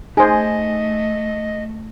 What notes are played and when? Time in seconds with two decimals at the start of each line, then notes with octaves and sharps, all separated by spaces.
0.17 A3 D#4 G#4 C5 D#5 G#5